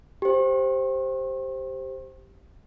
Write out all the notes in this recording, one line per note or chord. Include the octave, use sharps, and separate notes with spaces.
G4 C5